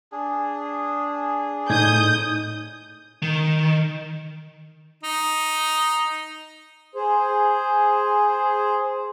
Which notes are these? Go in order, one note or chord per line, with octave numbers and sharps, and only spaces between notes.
D4 G#4
A2 D#4 D#6 G6 G#6
D#3
D#4
G#4 C5